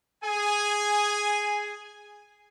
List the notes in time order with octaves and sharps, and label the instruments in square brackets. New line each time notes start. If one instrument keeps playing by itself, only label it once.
[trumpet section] G#4 G#5